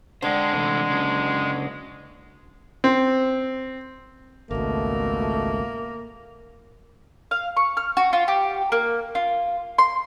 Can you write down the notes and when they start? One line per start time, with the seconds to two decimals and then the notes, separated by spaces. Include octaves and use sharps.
0.22 D3 G#3 C5 D5 G5
0.52 C3 E3 A3
0.90 C#3 F#3
2.84 C4
4.51 G#1 C#2 B2 A3 A#3
7.31 F5
7.57 C#6
7.77 F6
7.97 F#4
8.13 F4
8.28 G4
8.72 A#3
9.15 F4
9.79 C6